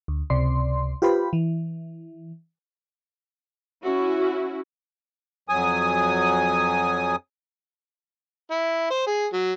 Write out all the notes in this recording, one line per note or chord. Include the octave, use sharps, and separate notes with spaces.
D2
C#2 C3 D5 C6
F4 G4 B4 C5 B5
E3
C#4 E4 F#4
F2 F#3 G#5 D#6
E4
C5
G#4
F#3